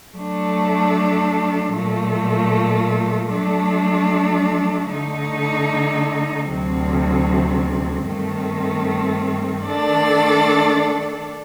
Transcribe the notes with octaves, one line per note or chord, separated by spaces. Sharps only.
F#3 A3 D4
A#2 F#3 A3
F#3 A3 D4
D3 A3 D#4
D2 C3 F#3 C4
G2 D#3 A3 C4
D#3 A3 D4 A4 D5